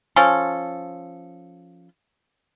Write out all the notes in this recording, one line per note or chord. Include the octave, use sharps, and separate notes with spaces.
F3 C#4 A4